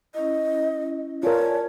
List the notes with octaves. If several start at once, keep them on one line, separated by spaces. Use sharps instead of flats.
C#4 E4 D#5
F4 A#4 C#5 D5 G#5 A5